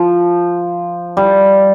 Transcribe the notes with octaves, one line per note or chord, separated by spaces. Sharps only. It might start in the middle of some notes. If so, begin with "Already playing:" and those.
Already playing: F3
G3